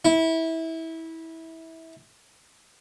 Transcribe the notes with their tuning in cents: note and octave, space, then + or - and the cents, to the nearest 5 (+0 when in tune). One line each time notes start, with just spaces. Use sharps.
E4 -20